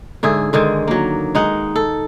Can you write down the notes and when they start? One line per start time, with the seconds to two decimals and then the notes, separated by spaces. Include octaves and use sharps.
0.23 G#2 D3 G#4 E5
0.53 G#2 D3 D#3 G#3
0.88 F#3 A#3
1.35 G#3 D#4 F#5
1.76 A4